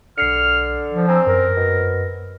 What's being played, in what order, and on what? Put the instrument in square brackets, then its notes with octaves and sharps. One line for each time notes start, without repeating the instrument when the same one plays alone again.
[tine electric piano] B1 C7 C#7 [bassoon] D3 [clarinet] F6
[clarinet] F3
[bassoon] C4 [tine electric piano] G#5 A#5 E6
[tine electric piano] F#2 [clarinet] A#4
[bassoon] B2